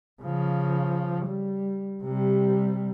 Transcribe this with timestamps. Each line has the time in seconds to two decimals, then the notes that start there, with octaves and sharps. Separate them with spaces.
0.22 C#3 F3
1.25 G3
2.03 C3 G3